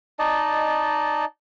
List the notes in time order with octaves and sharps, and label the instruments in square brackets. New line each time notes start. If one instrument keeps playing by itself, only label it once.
[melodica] D#4 D5 D#5 A5